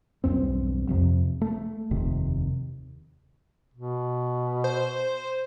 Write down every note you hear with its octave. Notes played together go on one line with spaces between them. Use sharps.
B1 E2 G2 C4
F2 C3
A3
F1 D#2 C3
B2
C5